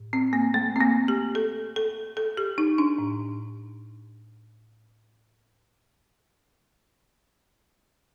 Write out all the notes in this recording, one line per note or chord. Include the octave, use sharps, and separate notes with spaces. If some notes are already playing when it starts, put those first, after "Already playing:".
Already playing: A2
C4
A#3
A3
C4
A#3
G4
A4
A4
A4
G4
D#4
D4
A2